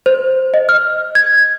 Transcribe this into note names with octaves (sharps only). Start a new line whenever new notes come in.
C5
D#5
F6
G#6